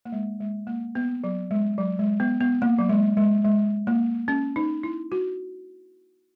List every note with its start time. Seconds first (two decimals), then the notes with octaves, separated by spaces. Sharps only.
0.05 A#3
0.12 G#3
0.40 G#3
0.67 A#3
0.95 B3
1.24 F#3
1.51 G#3
1.78 F#3
1.99 G#3
2.20 B3
2.40 B3
2.62 A#3
2.79 F#3
2.89 G#3
3.17 G#3
3.45 G#3
3.87 A#3
4.28 C#4
4.56 D#4
4.83 E4
5.12 F#4